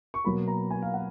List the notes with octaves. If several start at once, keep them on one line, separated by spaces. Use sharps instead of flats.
C#6
B2 F#3 A#3 B5
A#5
G#5
F5
F#5